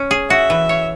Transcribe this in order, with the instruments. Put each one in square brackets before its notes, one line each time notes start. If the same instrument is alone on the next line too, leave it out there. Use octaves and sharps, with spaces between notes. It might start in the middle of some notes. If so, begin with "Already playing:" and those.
Already playing: [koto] C#4
G#4
[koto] F#4 [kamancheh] E5
[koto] E3
C#5